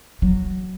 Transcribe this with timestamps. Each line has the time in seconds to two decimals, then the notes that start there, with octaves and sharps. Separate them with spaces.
0.22 F#3